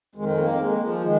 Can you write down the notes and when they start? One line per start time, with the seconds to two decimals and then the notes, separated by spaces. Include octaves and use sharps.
0.15 F2 D#3 G#3
0.29 G#3
0.38 A#3
0.58 G#3
0.80 F3
1.01 D#3 G#3